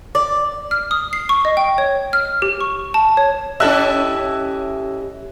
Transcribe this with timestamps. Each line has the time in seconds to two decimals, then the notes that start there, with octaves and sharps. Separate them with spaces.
0.15 D5
0.71 F6
0.91 D#6
1.13 C7
1.29 C#6
1.45 D#5
1.57 G5
1.78 C#5
2.13 F6
2.42 G4
2.61 C#6
2.94 A5
3.17 C#5
3.60 C#4 E4 G4 A4 D#5 E5 E6 F#6